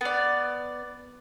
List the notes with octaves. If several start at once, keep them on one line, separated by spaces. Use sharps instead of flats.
B3 D5